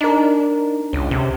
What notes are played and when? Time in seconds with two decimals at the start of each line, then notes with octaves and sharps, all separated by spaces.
0.01 D4 D#4 A#4
0.93 C#2 C#4
1.11 C3